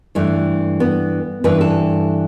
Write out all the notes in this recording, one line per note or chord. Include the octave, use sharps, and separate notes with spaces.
G2 E3 A3
B3
G2 E3 B4
A4